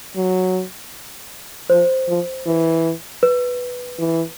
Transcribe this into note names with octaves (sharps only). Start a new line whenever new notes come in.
F#3
F3 C5
F3
E3
B4
E3